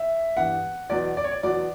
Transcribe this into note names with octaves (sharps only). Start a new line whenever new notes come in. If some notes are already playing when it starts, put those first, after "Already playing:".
Already playing: E5
G2 E3 B3 F#5
E2 B2 F#3 B3 D5
D5
C#5
D5
E2 B2 F#3 B3 D5